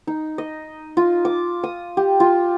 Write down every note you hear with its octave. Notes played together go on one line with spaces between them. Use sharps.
D#4
D#5
F4
D6
D#6
G4
F4